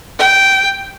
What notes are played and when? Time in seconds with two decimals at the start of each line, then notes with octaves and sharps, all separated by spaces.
0.19 G5